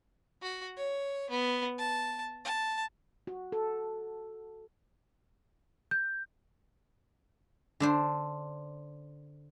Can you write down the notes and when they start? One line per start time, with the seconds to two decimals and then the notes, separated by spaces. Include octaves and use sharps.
0.42 F#4
0.77 C#5
1.30 B3
1.78 A5
2.45 A5
3.27 F#4
3.52 A4
5.91 G6
7.80 D3 D4 C5